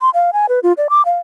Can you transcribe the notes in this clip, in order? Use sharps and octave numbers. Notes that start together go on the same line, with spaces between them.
C6
F5
G#5
B4
F4
D5
D6
F5